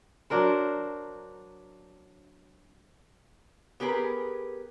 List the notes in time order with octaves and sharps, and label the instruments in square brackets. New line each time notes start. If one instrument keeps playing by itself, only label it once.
[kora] F#3 D4 A#4 C5
[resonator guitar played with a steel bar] B3 G4 G#4 A#4 B4